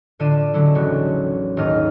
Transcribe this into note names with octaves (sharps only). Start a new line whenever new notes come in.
A2 D3 F4 D5 D#7 E7
D3 F#3 G#3 C#4 E4
D#1 A1 C#3 F#4
D#1 G#1 G#2 D#5 F6